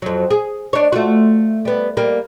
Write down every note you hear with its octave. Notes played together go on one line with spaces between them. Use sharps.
F2 F#3
G#4
D4 C#5
A3 F4 F#4
G3 B3
G3 A#3